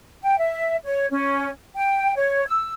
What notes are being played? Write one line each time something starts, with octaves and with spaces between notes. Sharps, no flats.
G5
E5
C#5
C#4
G5
C#5
E6